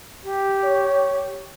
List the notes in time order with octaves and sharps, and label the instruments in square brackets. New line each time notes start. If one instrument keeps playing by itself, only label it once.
[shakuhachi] G4
[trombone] C#5